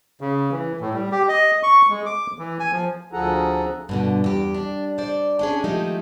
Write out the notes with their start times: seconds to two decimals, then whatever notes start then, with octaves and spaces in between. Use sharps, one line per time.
0.21 C#3
0.52 E3
0.80 A2
0.93 G3
1.12 G4
1.28 D#5
1.63 C#6
1.90 G#3
2.06 D6
2.38 E3
2.60 G#5
2.72 F3
3.13 D2 F3 G#4 A4 F#5 A#5
3.89 G2 B2 D3
4.24 E2 G4
4.55 D4
4.98 C5 D5
5.39 C#4 D4 G#4
5.64 D#3 F3 G#3 A3 D#4 G4